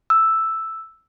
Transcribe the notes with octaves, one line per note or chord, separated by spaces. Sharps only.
E6